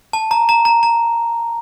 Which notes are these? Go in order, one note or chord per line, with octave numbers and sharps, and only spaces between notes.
A5
A#5
A#5
A#5
A#5